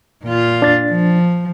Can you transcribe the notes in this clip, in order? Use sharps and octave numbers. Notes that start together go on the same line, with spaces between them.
A#2 F4
D4 A6
F3